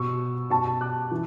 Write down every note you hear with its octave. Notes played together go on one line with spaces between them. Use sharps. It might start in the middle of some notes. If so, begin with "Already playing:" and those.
Already playing: B2 C#6 E6
B2 A5 C#6
D6 F#6
E3